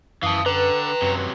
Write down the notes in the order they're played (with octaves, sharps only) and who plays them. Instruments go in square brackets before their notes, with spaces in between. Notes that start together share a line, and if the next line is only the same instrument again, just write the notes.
[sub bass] F#2 [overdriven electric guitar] E3 [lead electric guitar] F5 A5 [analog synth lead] D#6
[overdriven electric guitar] D3 [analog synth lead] B4 [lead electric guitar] G5 A#5
[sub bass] F#2 [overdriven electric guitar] C3 F#3